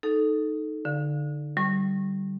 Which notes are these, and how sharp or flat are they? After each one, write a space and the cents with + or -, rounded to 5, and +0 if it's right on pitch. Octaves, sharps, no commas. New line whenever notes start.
D#4 +0 A4 -10
D3 +0 F5 +10
G3 -20 C#6 -30